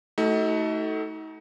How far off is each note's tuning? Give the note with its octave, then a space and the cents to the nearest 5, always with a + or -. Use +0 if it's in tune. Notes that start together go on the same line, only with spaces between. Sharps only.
A3 +0 D#4 +35 F#4 +30